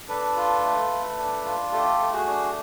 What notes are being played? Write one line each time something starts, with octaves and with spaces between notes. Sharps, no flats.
D4 A4 B4
F4
A3
A3
D4
F4
A3 G4 A4
A3
F#4 G#4
D4